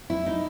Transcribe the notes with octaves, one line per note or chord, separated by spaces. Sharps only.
E4
D#4